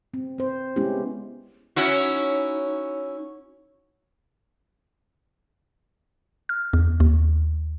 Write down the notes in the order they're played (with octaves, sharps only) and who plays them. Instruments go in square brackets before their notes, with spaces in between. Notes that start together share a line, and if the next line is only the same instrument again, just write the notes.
[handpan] C4
C4 C5
G#3 B3 C#4 E4 G4
[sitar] C#4 E4 F#4 [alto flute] D#4
[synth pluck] F6
E2
D#2